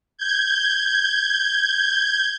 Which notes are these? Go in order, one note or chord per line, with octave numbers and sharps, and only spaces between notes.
G6 G#6